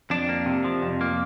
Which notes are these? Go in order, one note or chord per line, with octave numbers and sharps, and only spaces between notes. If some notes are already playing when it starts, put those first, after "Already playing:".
F2 D4
A#3
C3
F3
F2
A#3